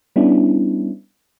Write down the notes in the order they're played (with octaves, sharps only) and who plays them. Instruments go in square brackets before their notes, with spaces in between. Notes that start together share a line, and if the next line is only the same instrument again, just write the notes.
[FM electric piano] G3 B3 C#4 D4 E4